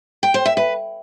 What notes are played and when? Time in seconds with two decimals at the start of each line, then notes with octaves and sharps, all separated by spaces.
0.23 G5
0.34 C5
0.45 E5
0.57 B4